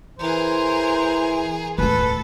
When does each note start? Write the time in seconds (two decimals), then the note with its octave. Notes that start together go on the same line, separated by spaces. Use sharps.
0.19 E3 G#4 A#4 C5
1.78 D1 A3 A4 B4